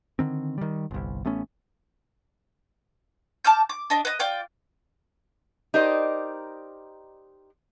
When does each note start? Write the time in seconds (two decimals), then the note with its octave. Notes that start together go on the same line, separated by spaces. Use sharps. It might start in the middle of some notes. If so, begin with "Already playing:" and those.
0.19 D3 D#3 C4
0.58 D#3 G3
0.91 G1 C2
1.25 A1 A3 B3 C#4
3.44 A5 D6 F6 G6
3.69 D6
3.90 D4 D#5
4.05 B4 D#5
4.19 F4 D5 G5 G6
5.74 D#4 G4 A#4 C5 D5 D#5